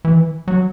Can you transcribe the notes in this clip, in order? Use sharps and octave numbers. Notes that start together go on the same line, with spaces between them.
E3
F#3